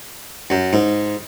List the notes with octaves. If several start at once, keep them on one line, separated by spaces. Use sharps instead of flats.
F#2
G#2